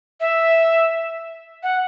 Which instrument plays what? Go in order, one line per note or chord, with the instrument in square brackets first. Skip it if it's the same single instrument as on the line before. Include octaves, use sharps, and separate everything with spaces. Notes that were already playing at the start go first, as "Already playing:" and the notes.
[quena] E5
F#5